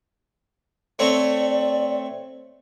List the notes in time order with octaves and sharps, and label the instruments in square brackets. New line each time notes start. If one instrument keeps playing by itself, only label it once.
[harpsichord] A3 C4 C#5 [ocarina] D5